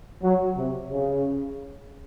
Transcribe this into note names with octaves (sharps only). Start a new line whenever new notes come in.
F#3
C3
C#3